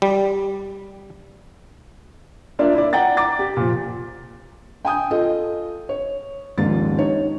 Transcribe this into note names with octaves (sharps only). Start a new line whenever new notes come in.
G3
A#3 D4 F4 D5 E5 F5
E4 D5
D5 F#5 G5 A#5 A6
A#5 D6 A6
G4
A#2 F3
G5 G#5 D#6 G6
F4 A4 D#5
C#5
D#1 G#2 D#3 F3 F4 A6
D#4 C#5